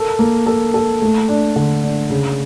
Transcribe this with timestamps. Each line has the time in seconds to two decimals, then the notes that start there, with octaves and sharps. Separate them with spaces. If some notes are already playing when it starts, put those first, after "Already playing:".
Already playing: A4 A#4
0.19 A#3
0.46 A4
0.74 A4
1.02 A3
1.29 D4
1.56 D3
1.84 D4
2.10 C#3